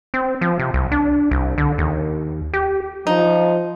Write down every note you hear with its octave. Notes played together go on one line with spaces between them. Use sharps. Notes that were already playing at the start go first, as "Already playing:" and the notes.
C4
F3
C3
C2
D4
C2
D3
D#2
G4
F3 D#4